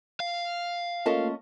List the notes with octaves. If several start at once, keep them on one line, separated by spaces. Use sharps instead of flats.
F5
A3 A#3 C#4 F4 D#5 A5